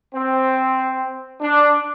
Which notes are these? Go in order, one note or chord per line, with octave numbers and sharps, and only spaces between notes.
C4
D4